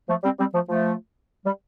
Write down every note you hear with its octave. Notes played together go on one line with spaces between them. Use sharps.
F3 A3
G3 C4
G3 C4
F3 A3
F3 A3
G3